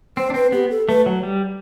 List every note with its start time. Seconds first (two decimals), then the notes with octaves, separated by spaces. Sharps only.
0.17 C4 C5
0.30 D4
0.34 C4 B4
0.52 B3 G4
0.70 A4
0.88 A3 B4
1.06 F#3
1.23 G3